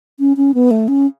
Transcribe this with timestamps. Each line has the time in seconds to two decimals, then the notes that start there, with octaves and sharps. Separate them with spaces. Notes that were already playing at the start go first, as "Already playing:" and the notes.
0.20 C#4
0.37 C#4
0.54 B3
0.71 A3
0.88 C#4